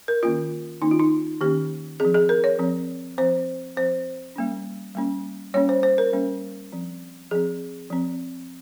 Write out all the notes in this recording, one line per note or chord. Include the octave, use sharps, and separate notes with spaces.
A#4
D#3 A#3 C#4 F4
D#3 A#3 C#4 D#4
F4
D#4
D#3 A#3 C#4 G4
F3 C4 G#4
G#4
A#4
C#5
F3 C4
F3 C4 C5
F3 C4 C5
G3 A#3 C#4
G3 A#3 C#4
G3 A#3 C#4 C#5
C5
C5
A#4
G3 A#3 C#4
F3 C4
F3 C4 G#4
F3 C4